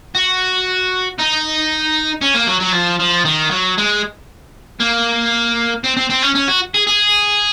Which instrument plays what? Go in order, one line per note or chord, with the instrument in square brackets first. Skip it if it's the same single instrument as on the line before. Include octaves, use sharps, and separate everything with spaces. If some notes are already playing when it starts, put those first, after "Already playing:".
[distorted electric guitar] F#4
D#4
C#4
A#3
F#3
F#3
F3
F3
D#3
F#3
G#3
A#3
C4
C4
C4
C#4
C#4
F#4
G#4
G#4